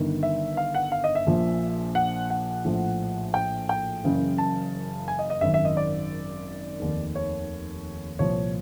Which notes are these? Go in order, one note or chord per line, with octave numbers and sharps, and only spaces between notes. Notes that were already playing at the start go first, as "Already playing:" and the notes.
Already playing: G1 G2 D#3
E5
F5
F#5
F5
D#5
E5
A#1 A#2 F3
F#5
F#5
A#1 A2 F3
G5
G5
F#1 F#2 C#3 E3
A5
G#5
D#5
D#5
G#1 F#2 D#3 E5
E5
D#5
D5
F1 D#2 D#3
C#5
C2 A#2 F3 C#5